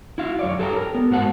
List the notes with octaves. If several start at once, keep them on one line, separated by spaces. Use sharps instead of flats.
E4 F#4 F5
F#2 C#5 D5
G4 A4 B4 F5 G5 A#5
A#4
B3
G#2 F#4 C5 F#5 A5